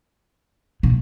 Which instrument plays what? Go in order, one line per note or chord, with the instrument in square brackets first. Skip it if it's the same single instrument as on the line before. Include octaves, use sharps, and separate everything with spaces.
[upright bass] A#2